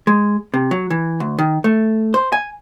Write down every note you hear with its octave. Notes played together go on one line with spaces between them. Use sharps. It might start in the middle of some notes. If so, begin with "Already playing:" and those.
G#3
C3
F#3
E3
D2
D#3
A3
C5
G#5